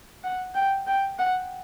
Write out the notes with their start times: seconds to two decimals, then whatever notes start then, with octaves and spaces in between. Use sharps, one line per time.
0.24 F#5
0.55 G5
0.87 G5
1.19 F#5